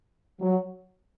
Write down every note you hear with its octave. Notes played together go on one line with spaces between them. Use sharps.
F#3